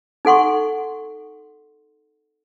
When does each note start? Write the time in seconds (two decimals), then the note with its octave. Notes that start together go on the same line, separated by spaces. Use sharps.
0.25 D#4 A4 F#5 C6 C#6